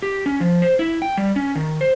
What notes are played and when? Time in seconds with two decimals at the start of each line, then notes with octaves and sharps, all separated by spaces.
0.02 G4
0.26 C#4
0.40 F3
0.62 C5
0.79 E4
1.02 G5
1.17 G3
1.36 C#4
1.55 D#3
1.81 C5